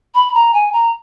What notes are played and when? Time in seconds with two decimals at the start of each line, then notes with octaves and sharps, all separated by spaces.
0.15 B5
0.34 A#5
0.54 G#5
0.73 A#5